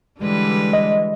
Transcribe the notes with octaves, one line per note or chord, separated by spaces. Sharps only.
D3 E3 G3 G#3 B4
D#5